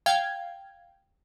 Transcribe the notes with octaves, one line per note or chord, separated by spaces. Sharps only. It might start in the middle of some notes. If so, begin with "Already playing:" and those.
F5 G5 G#6